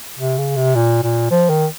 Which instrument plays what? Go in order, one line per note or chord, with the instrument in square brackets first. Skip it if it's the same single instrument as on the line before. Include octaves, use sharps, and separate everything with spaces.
[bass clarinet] C3
C#3
C3
A#2
A#2
F3
D#3